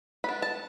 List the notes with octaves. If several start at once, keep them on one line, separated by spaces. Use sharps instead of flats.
B3 D4 B5
A5